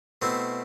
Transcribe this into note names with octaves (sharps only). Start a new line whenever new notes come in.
B2 A3 C4 E4